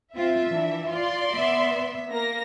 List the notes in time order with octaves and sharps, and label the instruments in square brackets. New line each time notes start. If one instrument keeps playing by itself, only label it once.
[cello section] C4 F4 [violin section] E5
[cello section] E3 D4
[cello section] F4 [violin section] D5 C6
[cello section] B3 E5
[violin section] A#3 A#6